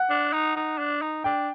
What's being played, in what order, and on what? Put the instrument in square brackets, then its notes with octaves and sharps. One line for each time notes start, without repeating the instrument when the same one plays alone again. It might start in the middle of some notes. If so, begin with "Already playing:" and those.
Already playing: [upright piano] F#5
[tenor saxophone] D4
D#4
D#4
D4
D#4
[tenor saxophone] D4 [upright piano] G5